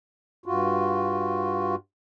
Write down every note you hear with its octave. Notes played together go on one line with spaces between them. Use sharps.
G2 F4 F#4